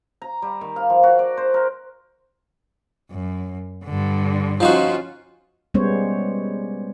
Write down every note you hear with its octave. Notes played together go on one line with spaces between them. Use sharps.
A#5
G3
D#3
F5
F3
F#4
D5
C5
A#4
F#2
G2 D3
F3 C#4 D#4 F4 F#4
G3 G#3 B3 C#4 C5 C#5